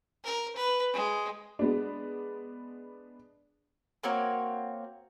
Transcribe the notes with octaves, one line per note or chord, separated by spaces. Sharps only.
A#4
B4
G#3
G#3 B3 D4
A#3 C4 F#4 C#5